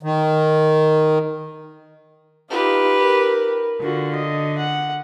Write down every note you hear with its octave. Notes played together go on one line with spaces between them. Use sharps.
D#3
D#4 F4 G4 B4
A#4
D3 F4 F#4
D#5
F#5